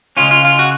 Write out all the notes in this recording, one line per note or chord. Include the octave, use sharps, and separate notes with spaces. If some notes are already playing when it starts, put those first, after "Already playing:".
C#2 C#3 G#3 C#4 F4
F4
F4
F#4